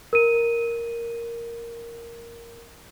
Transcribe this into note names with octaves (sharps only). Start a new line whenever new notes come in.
A#4 D#7